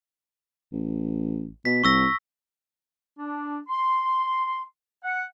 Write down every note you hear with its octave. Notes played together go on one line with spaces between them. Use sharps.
A1
B2 B6
C2 C#6 E6 A#6
D4
C6
F#5